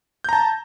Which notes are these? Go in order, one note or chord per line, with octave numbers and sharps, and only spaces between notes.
A5 A#5 G6